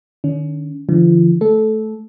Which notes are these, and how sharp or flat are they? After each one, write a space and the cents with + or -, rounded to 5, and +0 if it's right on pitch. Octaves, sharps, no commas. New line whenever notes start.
D#3 -35 C#4 +30
D3 +0 F3 -40
A3 -15 A4 -15